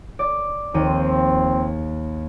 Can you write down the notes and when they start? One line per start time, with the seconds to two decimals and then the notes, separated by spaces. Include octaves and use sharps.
0.19 D5
0.74 D#2 F3 C4 G4 D#7